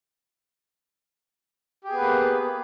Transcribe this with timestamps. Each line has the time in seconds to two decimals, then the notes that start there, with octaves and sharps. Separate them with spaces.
1.84 G4
1.88 G#4
1.92 B3
1.96 B4
2.01 A#3